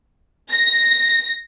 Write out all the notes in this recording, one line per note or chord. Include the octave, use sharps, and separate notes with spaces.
A#6